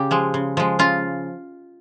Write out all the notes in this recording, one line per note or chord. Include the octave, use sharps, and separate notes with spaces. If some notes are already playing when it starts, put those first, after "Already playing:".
Already playing: C#3 G4
F3 G#3
C#3
F3 G#3
C#3 F4